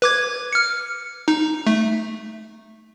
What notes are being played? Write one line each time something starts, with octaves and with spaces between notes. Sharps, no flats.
B4 D6 G#6
F6 C#7
D#4
A3